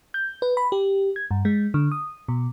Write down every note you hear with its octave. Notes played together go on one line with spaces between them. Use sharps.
G6
B4
B5
G4
G#6
G2
G#3
D3
D#6
B2